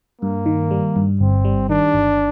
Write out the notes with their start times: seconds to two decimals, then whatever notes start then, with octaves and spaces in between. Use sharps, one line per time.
0.21 G2 A#3
0.46 D#3
0.71 G3
0.96 G2
1.20 G1 C4
1.45 G3
1.69 D#3 D4
1.94 G1